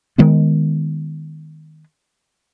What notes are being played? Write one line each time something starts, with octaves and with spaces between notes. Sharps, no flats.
D#3 G#3 B3